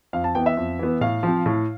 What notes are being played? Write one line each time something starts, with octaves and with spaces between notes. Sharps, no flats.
F2 F5
A5
E3 B3 G5
E5
F2
E3 B3
A2 F5
F3 C4
A2